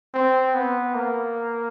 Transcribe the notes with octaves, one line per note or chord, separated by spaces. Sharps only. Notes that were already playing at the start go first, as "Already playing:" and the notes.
C4
B3
A#3